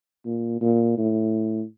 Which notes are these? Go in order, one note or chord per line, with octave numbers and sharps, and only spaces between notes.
A#2
A#2
A2